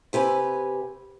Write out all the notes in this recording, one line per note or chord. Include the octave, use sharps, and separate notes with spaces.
C3 G4 B4 G#5